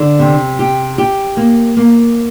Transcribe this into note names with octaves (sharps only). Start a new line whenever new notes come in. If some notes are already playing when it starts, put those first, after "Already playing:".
Already playing: D3
C3
G4
G4
A#3
A#3